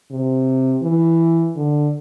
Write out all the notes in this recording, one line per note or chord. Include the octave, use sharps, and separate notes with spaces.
C3
E3
D3